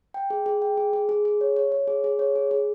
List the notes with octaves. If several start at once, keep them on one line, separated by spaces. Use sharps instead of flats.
G5
G#4
G#4
G5
G#4
G#4
G#4
G#4
C#5
C#5
C#5
G#4
G#4
C#5
G#4
G#4